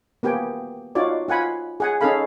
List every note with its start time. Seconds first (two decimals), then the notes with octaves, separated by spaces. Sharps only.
0.23 A#3 B3 G4 G5 G#5
0.95 D#4 F4 F#4 C#5 D5
1.28 F4 F#5 G#5 B5
1.80 G#4 F#5 G#5
2.01 C#4 D#4 G#4 A4 F5 B5